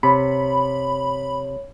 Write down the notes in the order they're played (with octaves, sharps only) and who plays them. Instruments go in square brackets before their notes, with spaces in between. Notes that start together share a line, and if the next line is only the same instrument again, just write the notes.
[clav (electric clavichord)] C3 [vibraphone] C#5 [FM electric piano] B5